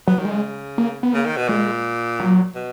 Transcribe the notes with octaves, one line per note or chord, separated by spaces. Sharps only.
F#3 B3
D#3 F#3
G#3
C#3
A#3
B3
C#3 A#3
D#3
B2
A#2 G#3
F#3
B2